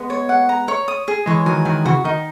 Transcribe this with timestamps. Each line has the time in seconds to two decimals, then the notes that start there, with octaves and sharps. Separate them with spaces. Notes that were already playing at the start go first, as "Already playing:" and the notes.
Already playing: G#3 B3
0.10 C#5
0.29 F#5
0.49 A#5
0.68 C#5
0.88 D#6
1.08 G#4
1.26 E3 G#3 C#5
1.46 D#3 F#3 G#5
1.65 D#3 F#3 G#5
1.85 C#3 E3 F#4
2.04 D#3 D#4